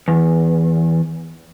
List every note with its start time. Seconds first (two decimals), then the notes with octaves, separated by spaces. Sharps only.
0.08 E2